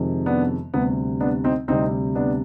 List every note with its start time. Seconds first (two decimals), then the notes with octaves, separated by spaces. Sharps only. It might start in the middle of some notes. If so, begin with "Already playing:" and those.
Already playing: F2 C3 D#3 G#3
0.26 B3 D4
0.74 D2 C3 G3 B3
1.20 B3 D4
1.44 C4 D#4
1.68 D2 C3 G3 C4 D#4
2.15 B3 D4